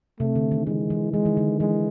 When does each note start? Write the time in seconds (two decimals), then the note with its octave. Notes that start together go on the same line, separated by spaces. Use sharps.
0.20 C3 A3
0.36 D3
0.51 D#3
0.67 E3 G#3
0.90 E3
1.13 E3 G#3
1.25 D#3
1.37 D3
1.60 E3 G#3